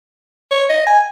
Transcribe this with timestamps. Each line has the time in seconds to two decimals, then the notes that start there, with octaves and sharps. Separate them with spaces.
0.51 C#5
0.70 D#5
0.87 G#5